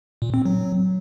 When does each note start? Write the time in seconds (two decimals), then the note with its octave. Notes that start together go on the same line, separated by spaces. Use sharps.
0.22 A#2
0.34 C4
0.46 F#3